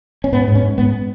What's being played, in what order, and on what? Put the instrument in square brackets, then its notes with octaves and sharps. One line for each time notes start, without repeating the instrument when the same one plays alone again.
[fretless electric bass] C#4
G#2 B3
G#2
C#4
G#2
G#2 B3